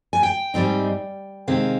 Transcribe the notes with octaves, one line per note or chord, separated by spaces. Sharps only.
G#5
G5
G#2 G3 C4 D#4
C3 D#3 G#3 C4 F5